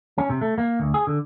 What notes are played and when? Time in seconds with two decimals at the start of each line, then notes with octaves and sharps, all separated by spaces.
0.18 C#4
0.30 C3
0.41 A3
0.58 A#3
0.80 D2
0.94 G#4
1.07 D3